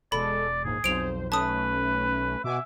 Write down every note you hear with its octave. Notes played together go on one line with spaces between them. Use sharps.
E1 G#3 A4 D5 B5
A#1 D#2 G#2 G#4
B1 F2 C5 D7 F7
A3 C#4 B4 A5 D#6
B2 E5 F#5 G#5 D6